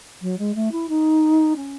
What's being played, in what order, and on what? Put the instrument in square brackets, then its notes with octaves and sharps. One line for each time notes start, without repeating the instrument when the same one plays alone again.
[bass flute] F#3
G#3
A3
E4
D#4
C#4